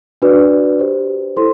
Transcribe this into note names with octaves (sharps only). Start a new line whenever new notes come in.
D4 F#4 B4 D5
G4 C5
E4 A4 C5 C6